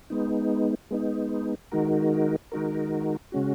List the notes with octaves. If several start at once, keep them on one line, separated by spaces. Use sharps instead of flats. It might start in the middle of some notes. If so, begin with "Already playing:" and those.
G#3 B3 D#4
G#3 B3 D#4
D#3 G#3 D#4 F#4 A#4
D#3 G#3 D#4 F#4 A#4
C#3 G#3 C#4 F#4